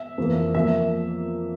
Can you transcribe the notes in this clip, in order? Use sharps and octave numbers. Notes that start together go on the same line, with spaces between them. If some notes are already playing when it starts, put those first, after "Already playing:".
Already playing: E5
F2 E3 A#3
F3 A#3 E5